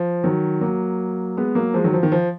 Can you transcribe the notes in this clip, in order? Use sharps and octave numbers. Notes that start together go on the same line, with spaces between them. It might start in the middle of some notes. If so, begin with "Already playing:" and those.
Already playing: F3
D#3 F#3
F#3 A#3
G#3 B3
F#3 A#3
F3 G#3
D#3 F#3
F3
D#3
F3